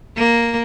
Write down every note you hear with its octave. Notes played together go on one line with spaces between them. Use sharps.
A#3